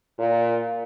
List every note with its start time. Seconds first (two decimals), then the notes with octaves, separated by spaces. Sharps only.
0.19 A#2